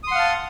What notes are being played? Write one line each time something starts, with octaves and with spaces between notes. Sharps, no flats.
F5 F#5 A5 C6 D#6